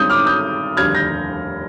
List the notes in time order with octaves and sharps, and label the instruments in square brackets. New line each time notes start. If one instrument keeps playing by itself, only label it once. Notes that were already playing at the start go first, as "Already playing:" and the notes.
Already playing: [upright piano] G2 D#3 G#3 C4 D#6 G6
D6 F6
D#6 G6
F1 D#2 D3 G3 F6 G#6
G6 A#6